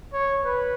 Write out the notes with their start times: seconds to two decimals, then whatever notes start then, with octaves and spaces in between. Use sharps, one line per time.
0.13 C#5
0.44 B4